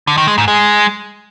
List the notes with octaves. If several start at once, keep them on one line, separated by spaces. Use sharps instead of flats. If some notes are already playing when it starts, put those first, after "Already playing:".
D3
D#3
G#3
G#2
G#3